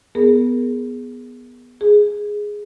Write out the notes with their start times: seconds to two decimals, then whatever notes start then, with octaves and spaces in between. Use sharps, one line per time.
0.15 B3 G#4 A#4
1.81 G#4